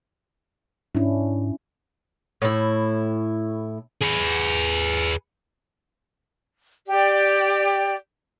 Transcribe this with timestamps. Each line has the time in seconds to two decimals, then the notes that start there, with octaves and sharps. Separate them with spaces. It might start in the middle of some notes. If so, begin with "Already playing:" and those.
0.95 G#2 C#4 D4 E4
2.42 A2 E4
4.02 G#4 B4
6.87 G4 D5